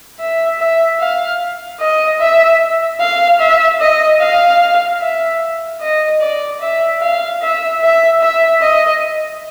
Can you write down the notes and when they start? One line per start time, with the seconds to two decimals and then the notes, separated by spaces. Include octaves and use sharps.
0.19 E5
0.59 E5
1.00 F5
1.80 D#5
2.20 E5
3.00 F5
3.40 E5
3.80 D#5
4.20 F5
5.00 E5
5.80 D#5
6.21 D5
6.61 E5
7.01 F5
7.41 E5
7.81 E5
8.21 E5
8.61 D#5